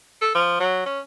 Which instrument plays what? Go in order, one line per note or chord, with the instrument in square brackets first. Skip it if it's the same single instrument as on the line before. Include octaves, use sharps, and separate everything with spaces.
[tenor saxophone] A4
F3
F#3
C#4